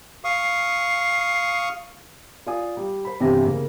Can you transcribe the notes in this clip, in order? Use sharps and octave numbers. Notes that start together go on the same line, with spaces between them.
F5 C#6 D#6 C7
F4 D5 G#5 D#6
G3
C5 B5
G1 C3 E3 G4 A#6
C#3 A#3